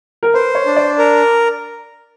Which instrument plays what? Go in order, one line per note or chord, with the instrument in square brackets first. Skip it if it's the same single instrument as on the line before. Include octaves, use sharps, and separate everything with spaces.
[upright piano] A#4
[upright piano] B4 [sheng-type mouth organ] C5
[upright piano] C#5
[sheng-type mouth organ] D4
[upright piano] D5
[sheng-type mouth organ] A#4